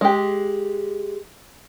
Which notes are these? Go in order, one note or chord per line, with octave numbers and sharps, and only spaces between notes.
G#3 G4